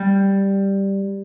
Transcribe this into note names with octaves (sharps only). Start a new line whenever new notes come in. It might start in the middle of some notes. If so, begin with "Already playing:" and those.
Already playing: G3